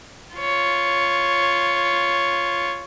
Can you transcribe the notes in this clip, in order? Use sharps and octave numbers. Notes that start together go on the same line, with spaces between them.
F4 C#5